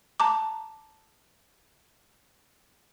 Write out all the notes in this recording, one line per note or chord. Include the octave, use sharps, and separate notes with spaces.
A5 A#5 D6